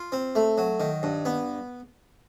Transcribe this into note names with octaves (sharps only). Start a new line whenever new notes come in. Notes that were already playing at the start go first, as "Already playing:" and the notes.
Already playing: F4
C4
A3
F#3
D#3
G2
B3